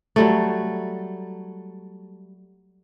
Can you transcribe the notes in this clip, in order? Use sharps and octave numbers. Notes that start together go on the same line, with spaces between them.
F#3 G3 A3